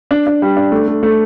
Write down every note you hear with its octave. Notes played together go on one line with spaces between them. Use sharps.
D4
D4
G3
D4
A3
A3
A3